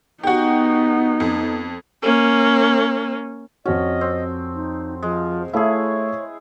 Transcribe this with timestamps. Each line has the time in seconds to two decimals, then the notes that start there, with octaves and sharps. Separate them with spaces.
0.23 B3 D#4 F#4 G4
1.20 F2
2.02 A#3 C#4
3.65 F2 C#4 F#4 D#5
4.01 C4
4.55 D#4
5.02 F3 G#3
5.53 A3 E4 G#4 C#5 E5 F5